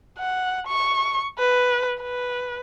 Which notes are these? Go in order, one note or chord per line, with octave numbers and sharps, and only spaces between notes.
F#5
C#6
B4
B4